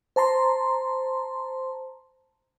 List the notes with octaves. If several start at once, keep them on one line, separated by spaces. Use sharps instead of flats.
C5 A5 A#5 C6